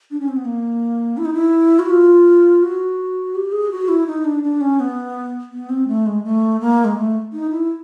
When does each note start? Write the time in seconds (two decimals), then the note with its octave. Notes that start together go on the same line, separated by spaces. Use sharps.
0.11 D4
0.20 C#4
0.28 C4
0.37 B3
0.45 A#3
1.17 E4
1.25 D#4
1.34 E4
1.79 F#4
1.90 F4
2.63 F#4
3.35 G4
3.52 G#4
3.71 F#4
3.89 E4
4.07 D#4
4.25 D4
4.43 D4
4.61 C#4
4.80 B3
5.52 B3
5.69 C4
5.88 A3
6.06 G#3
6.24 A3
6.60 A#3
6.85 G#3
6.97 A3
7.33 D#4
7.51 E4